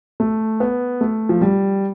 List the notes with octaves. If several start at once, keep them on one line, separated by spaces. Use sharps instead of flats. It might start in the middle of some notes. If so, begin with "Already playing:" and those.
A3
B3
A3
F3
G3